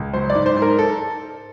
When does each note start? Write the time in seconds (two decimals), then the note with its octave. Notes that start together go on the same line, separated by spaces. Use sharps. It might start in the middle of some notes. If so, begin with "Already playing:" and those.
Already playing: C#2
0.13 F#3 C5
0.30 D5
0.35 G#2
0.46 C5
0.56 G#2
0.62 A#4
0.79 A4